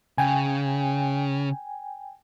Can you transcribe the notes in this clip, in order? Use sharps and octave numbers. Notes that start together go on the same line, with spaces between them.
C#3 G5 G#5